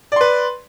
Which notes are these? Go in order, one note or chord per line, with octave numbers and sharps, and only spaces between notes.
B4 D5 C6